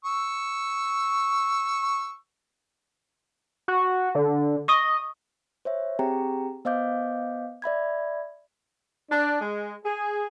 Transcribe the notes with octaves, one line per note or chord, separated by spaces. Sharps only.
C#6 E6
F#4
D3
D#5 C#6 D#6 G7
C5 C#5 E5
C4 G4 G#4 G5 A#5
B3 C5 D#5 F5 D6 G6
D5 E5 B5 G#6
D4
G#3
G#4